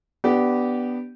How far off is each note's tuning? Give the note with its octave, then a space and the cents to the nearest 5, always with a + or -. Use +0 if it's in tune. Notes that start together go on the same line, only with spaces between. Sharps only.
B3 +0 D4 +0 G4 -15